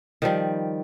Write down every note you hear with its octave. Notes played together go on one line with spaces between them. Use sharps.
D#3 F3 G3